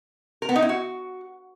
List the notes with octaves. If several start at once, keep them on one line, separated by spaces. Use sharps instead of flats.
A#4
B3
D#4
E4
F#4